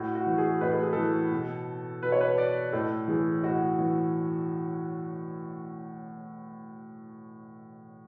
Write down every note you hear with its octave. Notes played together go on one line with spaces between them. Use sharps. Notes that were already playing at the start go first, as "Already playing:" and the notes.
Already playing: A2 F#4
F#4
E3
G#4
A2 B4
A4
G#4
E3 A4
B2
B2 B4
C#5
B4
D5
A2 A4
E3 G#4
A2 F#4
E3